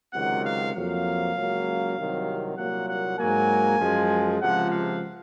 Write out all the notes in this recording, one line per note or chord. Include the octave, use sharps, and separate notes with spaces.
C#2 C3 D#3 F#3 F#5
F5
F2 C3 F#3 A#3 F5
C#2 C#3 F#3 A#3
C2 C3 D#3 F#3
C2 A#2 F#3 A#3 F#5
F#5
G#2 F#3 A#3 G#5
F#2 F3 G#3
C#2 C3 F3 F#5
F5